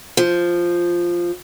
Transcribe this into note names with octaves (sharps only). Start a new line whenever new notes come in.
F3